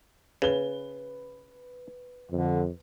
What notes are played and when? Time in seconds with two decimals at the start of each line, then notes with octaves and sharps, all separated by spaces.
0.42 C#3 B4 G7
2.31 F2 D3